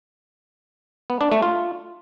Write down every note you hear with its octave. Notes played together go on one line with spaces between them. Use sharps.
B3
D4
A3
F4